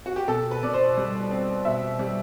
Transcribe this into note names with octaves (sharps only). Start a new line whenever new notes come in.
F#4
G4
B2 A4
B4
B2 D5
C5
G3
C4
B2 E5
G3